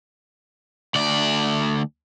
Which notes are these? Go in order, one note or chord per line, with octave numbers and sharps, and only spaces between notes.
D2 D5